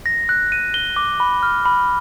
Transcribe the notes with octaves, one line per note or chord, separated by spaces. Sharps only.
A#6
F#6
D#7
G7
D6
B5
F6
B5